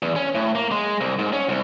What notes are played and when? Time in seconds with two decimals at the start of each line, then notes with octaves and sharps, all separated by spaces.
0.02 E2
0.16 C#4
0.35 A2
0.55 A#3
0.71 G#3
1.01 C2
1.19 G#2
1.33 C#4
1.49 C2